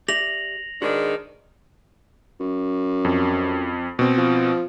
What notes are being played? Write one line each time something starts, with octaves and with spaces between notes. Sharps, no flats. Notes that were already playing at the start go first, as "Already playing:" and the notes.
G4 D5 E5 A#6 F7 F#7
G#2 D#3 D4 F#4 G#4 B4
F#2
F2
B2 C4
F3